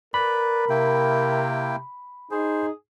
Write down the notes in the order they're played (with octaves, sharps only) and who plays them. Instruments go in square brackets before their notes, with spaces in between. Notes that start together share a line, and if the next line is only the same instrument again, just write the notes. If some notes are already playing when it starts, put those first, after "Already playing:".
[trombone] A#4 [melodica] B4 D5 [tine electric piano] B5
[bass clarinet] C3 [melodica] A#3 E4 G5
[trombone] D#4 [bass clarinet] G#4 [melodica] C5